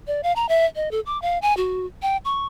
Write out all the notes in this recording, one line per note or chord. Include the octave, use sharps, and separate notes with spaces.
D5
F5
A#5
E5
D#5
A4
D6
F5
G#5
F#4
G5
C#6